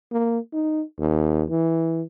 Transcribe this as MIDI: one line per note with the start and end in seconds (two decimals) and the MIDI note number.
0.11 0.39 58
0.53 0.82 63
0.99 1.45 39
1.50 2.03 52